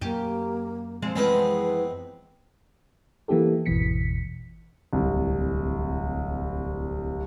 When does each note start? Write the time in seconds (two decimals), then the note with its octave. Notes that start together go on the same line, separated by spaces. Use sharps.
0.01 F#2 A#3 G4
1.02 F3 G#3 C4
1.15 E3 F3 G#3 B3 C4 D#4 B4
3.28 E3 A#3 B3 E4 G4 A4
3.66 G#1 E2 B2 E3 B6 C#7
4.93 D1 C2